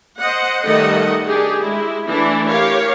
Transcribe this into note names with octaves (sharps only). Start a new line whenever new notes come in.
C5 D#5 F#5
D#3 G3 A3 A4 D#5 F#5
D4 G4 G#4
G#3 E4
E3 A3 D4 E4
G4 A#4 C#5 F5